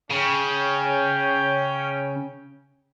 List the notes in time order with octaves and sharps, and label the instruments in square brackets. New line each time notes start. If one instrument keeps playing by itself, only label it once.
[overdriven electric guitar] C#3 [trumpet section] C#4 G5